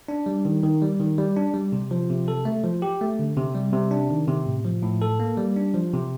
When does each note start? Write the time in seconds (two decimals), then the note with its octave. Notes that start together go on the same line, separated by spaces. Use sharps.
0.08 D4
0.26 G3
0.45 D#3
0.64 D#3
0.82 G3
1.00 D#3
1.18 G3
1.37 D4
1.54 G3
1.72 C3
1.91 F3
2.10 C3
2.28 A4
2.45 A3
2.64 F3
2.82 G4
3.01 A3
3.19 D3
3.37 C3
3.55 G3
3.73 C3
3.91 D4
4.11 D#3
4.28 C3
4.46 A2
4.65 F3
4.83 A2
5.02 A4
5.20 A#3
5.37 G3
5.57 D4
5.74 F3
5.93 C3